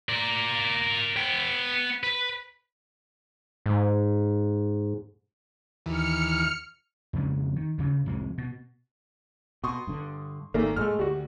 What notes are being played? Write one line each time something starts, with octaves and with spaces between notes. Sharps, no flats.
A#4 D5
B3 G5
B4
G#2
D#2 E3 F6 C#7
F2 C#3 F3 G#3
D#3
D2 C#3
C2 F2 G#3
B2
B2 C6 C#6 D#6
G2 D3
G#1 A#2 D#3 A3 A#3
G2 A#2 G#3 A3 A4 F6
D2 G3 F#4